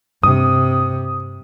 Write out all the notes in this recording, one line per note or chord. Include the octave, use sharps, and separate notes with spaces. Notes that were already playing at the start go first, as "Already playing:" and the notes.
G2 C3 D#6